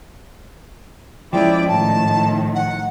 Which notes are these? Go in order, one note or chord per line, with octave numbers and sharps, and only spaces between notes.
F3 G#3 C#4 E4 D5 G5
A2 D#3 A5
F#5